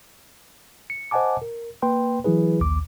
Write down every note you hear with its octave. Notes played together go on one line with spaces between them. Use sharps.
C#7
C5 D#5 F#5 G#5 A5 D6
A#4
A#3 B4 G5 C6
E3 F#3 E4 G#4 B4
A#1 D#2 D6